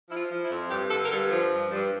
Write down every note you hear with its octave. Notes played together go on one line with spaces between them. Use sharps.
F3 E4
F4
F3
E4
F2
G2 G4
D3 A4
A#4
G2 A4
F3
G2
G2